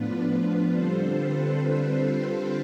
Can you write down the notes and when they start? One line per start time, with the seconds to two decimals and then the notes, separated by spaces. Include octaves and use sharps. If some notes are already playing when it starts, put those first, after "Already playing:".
Already playing: A2 F3 B3 D4 F4 B4
0.30 B4
0.73 D3 G3 C4 F4 A4 C5
1.17 B4